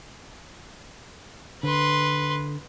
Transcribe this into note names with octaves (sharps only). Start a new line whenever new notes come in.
D3 B4 C6